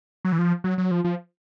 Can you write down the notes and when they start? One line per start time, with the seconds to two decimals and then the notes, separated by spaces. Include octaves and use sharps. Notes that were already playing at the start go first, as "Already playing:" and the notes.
0.25 F#3
0.32 E3
0.39 F3
0.64 F#3
0.78 F#3
0.91 F3
1.04 F3